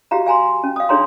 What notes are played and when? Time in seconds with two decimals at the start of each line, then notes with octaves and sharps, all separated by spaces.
0.11 F#4 G4 F5 A#5
0.26 F5 G#5 A#5 C6
0.63 C#4
0.76 F5 D#6
0.89 D4 D#4 G#4 C#5 A#5 C6